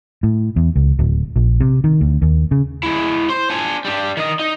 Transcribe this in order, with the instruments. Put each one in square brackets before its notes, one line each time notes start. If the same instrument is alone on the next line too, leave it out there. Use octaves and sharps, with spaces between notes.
[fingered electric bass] A2
E2
C#2
D1
A#1
C3
D#3
D2
D#2
C#3
[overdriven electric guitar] G#3 E4
C5 C6
D4 G#5
G3 D4
D#3 D#5
D#4